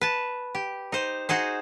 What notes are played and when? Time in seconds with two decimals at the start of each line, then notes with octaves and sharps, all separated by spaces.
0.01 B4 A5
0.55 G4
0.92 D#4 C5
1.29 D#4 F#4 G#4 C5